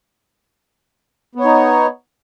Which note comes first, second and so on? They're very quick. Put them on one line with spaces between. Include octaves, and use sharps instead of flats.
B3 C#5 D#4